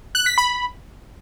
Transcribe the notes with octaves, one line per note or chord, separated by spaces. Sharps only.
F#6
B6
B5